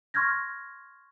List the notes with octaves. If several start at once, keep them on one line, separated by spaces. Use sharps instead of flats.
C6 C#6 F6 G6 G#6 A#6